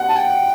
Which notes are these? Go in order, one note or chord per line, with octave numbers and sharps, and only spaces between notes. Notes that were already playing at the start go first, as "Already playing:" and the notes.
Already playing: F#5
A5
G5